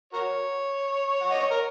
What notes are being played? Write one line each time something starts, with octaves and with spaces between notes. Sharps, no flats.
F#4 A#4 C#5
F#5
D#5
C#5
A#4